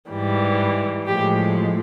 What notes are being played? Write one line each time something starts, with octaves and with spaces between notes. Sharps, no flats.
G#2 E3 G3
A2 F3 G#3 G4